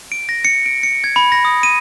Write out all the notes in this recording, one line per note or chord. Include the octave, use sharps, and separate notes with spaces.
D7
A#6
C#7
D7
C#7
G#6
B5
A#6
D#6
D#7